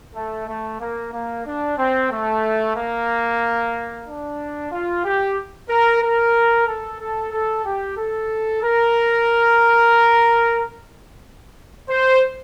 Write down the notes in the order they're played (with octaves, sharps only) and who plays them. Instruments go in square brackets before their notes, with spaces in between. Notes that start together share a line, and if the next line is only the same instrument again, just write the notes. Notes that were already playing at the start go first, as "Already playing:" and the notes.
[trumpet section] A3
A3
A#3
A#3
D4
C4
A3
A#3
D4
F4
G4
A#4
A#4
A4
A4
A4
G4
A4
A#4
C5